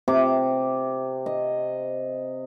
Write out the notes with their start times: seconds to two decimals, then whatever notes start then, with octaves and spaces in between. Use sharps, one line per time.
0.08 C3 D6
1.26 D#5